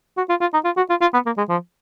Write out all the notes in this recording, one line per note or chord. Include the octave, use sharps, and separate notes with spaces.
F#4
F4
F4
D#4
F4
F#4
F4
F4
B3
A#3
G#3
F3